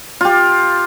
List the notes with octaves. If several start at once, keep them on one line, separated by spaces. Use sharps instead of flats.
F4 G4